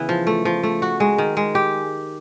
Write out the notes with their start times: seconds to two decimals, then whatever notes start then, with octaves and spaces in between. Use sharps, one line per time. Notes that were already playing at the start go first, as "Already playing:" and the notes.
Already playing: C#3 E3 B3
0.09 F3
0.27 A3
0.45 F3
0.63 A3
0.82 F#4
1.00 G#3
1.18 D#3
1.37 G#3
1.55 G4